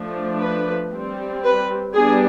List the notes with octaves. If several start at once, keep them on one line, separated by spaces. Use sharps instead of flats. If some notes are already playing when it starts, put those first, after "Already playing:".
Already playing: F3 A3 D4
B4
G3 C4
B4
G3 B3 D4 G#4